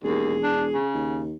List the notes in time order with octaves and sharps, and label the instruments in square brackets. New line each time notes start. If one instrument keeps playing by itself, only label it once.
[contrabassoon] E1 [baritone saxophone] D#2 [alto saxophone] G#4
[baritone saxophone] D4
C#3
[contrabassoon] D#2